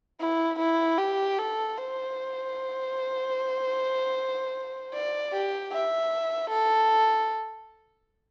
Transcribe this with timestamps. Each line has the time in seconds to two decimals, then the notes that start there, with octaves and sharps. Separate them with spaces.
0.20 E4
0.59 E4
0.98 G4
1.39 A4
1.78 C5
4.93 D5
5.33 G4
5.72 E5
6.50 A4